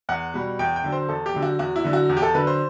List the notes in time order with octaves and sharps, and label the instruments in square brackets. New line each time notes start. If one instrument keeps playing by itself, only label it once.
[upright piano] E2 F#5
B2 G3
E2 G5
G5
D3 F#3
C5
E2 A4
G4
D3 F#3
F#4
E2 F#4
E4
D3 F#3
F#4
E2
G4
A4
D3 F#3 B4
C5